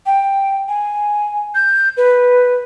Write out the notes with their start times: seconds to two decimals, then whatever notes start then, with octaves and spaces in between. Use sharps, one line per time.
0.06 G5
0.68 G#5
1.55 G6
1.97 B4